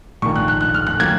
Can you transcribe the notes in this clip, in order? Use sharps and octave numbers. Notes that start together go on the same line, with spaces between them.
A#1 G#2 D#3 A#3 C#6
F#6
F#6
F#6
F6
F#6
D#3 F#3 A#3 G#6